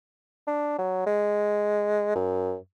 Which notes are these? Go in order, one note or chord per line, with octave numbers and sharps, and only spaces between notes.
D4
F#3
G#3
F#2